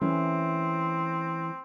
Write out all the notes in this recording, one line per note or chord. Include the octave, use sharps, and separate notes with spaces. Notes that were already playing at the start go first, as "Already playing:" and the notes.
E3 A3 C4 C#4